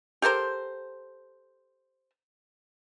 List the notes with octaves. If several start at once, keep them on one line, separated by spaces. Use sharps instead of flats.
G4 A4 A#4 C5